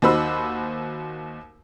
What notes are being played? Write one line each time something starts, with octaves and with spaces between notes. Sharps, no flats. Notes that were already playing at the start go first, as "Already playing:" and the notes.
D#2 D#4 F#4 C5 B5 E6